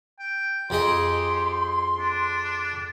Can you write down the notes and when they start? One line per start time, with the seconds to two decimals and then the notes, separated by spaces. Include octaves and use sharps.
0.20 G5
0.70 F2 G4 G#4 D#5 C6
1.99 D4